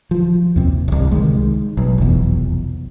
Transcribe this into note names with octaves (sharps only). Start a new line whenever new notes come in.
F3
D#2 C3
D1 C2
D#3 G#3
B1
F1 B1 E2